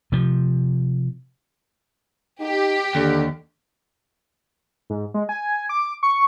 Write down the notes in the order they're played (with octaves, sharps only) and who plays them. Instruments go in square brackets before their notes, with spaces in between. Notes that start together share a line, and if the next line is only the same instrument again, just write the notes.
[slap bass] C3 F3
[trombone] D#4 [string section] G4
[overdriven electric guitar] D#2 [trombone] D3
[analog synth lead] G#2
G#3
G#5
D6
C#6